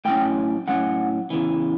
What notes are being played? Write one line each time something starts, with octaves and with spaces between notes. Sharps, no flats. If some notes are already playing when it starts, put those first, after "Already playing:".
A2 F#3 C#4 G5
A2 F#3 C#4 F#5
E2 C#3 E3